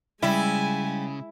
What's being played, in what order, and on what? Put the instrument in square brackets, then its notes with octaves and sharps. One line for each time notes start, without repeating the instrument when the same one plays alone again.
[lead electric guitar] C#3 [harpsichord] G3 [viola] G#3 G#5 [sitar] E4